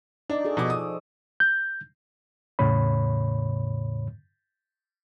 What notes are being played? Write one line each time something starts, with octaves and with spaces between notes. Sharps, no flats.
D4 D#4 D5
F#4 G#4 A4
B2 F3 D6
D#6
G6
E2 A2 C#3 C#5 B5